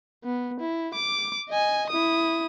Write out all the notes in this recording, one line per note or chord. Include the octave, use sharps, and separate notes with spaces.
B3
E4
D6
D#5 G#5
E4 D#6